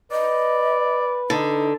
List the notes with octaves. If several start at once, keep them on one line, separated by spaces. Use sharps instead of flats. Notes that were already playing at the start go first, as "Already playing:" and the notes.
B4 D5 D#5
D3 D#4